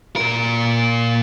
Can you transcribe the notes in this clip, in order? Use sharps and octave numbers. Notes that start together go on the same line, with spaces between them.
A#2 A#4